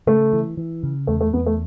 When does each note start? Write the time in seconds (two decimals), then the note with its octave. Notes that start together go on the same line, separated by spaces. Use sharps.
0.07 C#3 A3
0.33 E3
0.57 E3
0.83 C#3
1.07 E2 A3
1.21 A3
1.33 E2 B3
1.46 A3